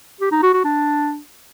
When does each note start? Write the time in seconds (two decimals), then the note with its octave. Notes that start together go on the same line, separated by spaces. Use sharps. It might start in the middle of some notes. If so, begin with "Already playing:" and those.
0.21 G4
0.32 D#4
0.43 F#4
0.54 F#4
0.64 D4